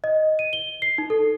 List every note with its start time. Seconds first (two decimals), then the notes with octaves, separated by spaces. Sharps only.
0.04 D#5
0.39 D#7
0.53 G7
0.82 C7
0.98 D#4
1.10 A4